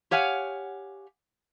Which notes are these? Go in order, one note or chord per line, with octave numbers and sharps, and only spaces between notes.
G4 C#5 F5 F#5 G#5